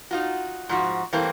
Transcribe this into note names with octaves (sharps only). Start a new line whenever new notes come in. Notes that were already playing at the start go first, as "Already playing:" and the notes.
D#4 F4 F#4
G#2 F3 F#4
E3 G3 A3 A#3 C4